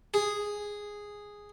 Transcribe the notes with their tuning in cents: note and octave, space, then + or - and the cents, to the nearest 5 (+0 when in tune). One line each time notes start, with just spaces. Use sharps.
G#4 -5